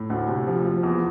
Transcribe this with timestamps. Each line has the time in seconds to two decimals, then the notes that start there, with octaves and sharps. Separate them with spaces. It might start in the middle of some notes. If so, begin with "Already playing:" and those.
Already playing: A2
0.10 D2
0.28 C3
0.47 F3
0.65 F3
0.83 E2